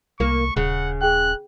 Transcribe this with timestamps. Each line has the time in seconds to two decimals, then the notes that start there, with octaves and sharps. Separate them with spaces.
0.20 C2 A#3 C#6
0.57 D#1 C#3 F#5
1.01 G#4 G5 F#6